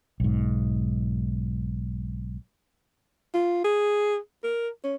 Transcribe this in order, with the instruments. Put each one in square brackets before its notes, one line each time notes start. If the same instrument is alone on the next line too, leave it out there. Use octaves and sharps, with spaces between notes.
[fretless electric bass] B1 G#2
[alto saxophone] F4
G#4
A#4
C#4